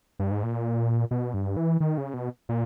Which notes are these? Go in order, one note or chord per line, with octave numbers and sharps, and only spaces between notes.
G2
G#2
A#2
B2
G2
E3
D#3
C#3
B2
A#2